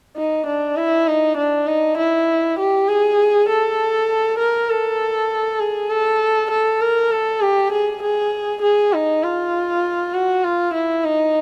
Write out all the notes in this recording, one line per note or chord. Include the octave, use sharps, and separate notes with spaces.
D#4
D4
E4
D#4
D4
D#4
E4
G4
G#4
A4
A#4
A4
G#4
A4
A4
A#4
A4
G4
G#4
G#4
G#4
D#4
F4
F#4
F4
E4
D#4